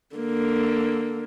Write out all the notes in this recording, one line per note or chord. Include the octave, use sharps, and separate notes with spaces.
D3 A#3